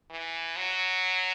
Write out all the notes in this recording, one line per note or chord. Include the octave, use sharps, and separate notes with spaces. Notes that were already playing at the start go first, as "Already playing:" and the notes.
E3
F#3